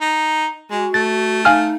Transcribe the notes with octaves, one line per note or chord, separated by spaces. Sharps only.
D#4
G#3 F#4
A3 A6
D#4 F5 G#5 F6